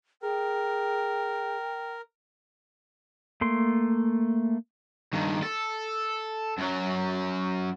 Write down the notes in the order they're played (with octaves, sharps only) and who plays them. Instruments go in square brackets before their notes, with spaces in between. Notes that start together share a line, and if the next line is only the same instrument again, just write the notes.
[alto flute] G#4 [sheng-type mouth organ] A#4 [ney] G5
[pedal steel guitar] A3 A#3 C6
[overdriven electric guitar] G2 D#3
A4
F#2 F#3